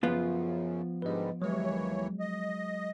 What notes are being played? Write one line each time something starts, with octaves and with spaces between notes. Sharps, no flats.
F#2 C#3 F3 B3 F4
G#2 D3 G3 B4 D#5
D#2 E3 F#3 G#3 C#5
D#5